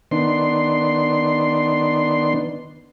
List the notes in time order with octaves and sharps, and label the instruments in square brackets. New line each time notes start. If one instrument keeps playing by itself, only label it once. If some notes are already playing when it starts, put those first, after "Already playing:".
[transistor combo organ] D#3 B3 D4 C6